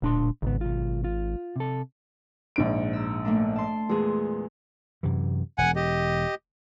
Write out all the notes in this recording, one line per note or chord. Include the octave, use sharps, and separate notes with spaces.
D1 A#2 D4 C6
G#1 C#2 G#2 B3
B1 F4
F4
C3 A4
A#1 G#2 D7
A#5 E6
A3 A#3 D4
A5 C6
E2 A#2 G#3 G#4
F#2 C3 E3
E1 F#5 G#5
G4 D#5